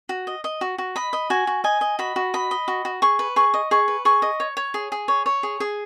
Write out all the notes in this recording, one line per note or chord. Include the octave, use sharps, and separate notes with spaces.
F#4
D#5
D#5
F#4
F#4
D#5 B5
D#5
F#4 G#5
F#4
D#5 G#5
D#5
F#4 B5
F#4
D#5 B5
D#5
F#4
F#4
G#4 C#6
B4
G#4 C#6
D#5
G#4 C#6
B4
G#4 C#6
D#5
C#5
C#5
G#4
G#4
C#5
C#5
G#4
G#4